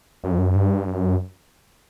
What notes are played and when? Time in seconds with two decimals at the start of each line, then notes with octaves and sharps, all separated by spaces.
0.24 F#2
0.31 F2
0.38 F#2
0.55 G2
0.87 F#2